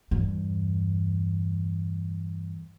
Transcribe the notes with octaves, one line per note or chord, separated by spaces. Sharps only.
E2 G2